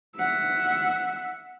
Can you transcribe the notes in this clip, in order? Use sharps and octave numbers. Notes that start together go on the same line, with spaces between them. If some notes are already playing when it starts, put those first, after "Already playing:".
E5 F#5